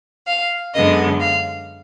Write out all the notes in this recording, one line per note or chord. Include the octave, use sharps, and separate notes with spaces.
F5
F#2 D3 G#3 B3 D#5
F5